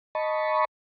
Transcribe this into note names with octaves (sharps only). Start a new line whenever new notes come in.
D#5 A5 B5 C#6